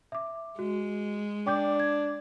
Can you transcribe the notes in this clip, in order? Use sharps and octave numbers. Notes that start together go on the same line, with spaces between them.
E5 D6
G#3 F#4
D4 G5 D6 G6
G#6